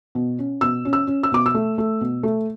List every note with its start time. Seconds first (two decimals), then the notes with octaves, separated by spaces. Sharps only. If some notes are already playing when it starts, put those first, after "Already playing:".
0.15 B2
0.39 C#4
0.61 B2 E6
0.85 C#4
0.93 E6
1.07 C#4
1.23 E6
1.32 B2 D6
1.46 E6
1.55 A3
1.78 A3
2.01 B2
2.23 A3